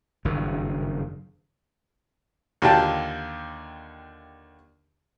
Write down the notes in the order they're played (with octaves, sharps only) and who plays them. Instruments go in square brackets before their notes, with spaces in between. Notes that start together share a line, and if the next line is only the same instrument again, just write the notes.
[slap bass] F#1 G2 D#3
[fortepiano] D#2 D3 F4 G4 A5